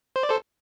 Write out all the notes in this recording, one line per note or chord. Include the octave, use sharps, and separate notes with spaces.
C5
D5
A4 C5